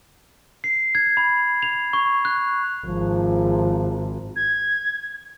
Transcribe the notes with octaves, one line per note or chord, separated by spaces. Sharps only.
C7
G#6
B5
F7
C#6
F#6
G#1 F3
G#6